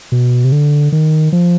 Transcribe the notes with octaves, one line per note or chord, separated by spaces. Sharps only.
B2
C3
D3
D#3
F3